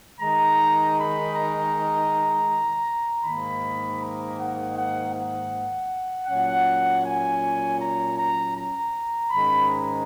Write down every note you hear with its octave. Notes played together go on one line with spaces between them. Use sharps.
D#3 G#3 D#4 A#5
B5
A#5
G#2 D#3 A#3 D#4 B5
A#5
F#5
F#5
F#5
A#2 F#3 C#4 F#5
G#5
A#5
A#5
A#5
G#2 D#3 G#3 C#4 B5
A#5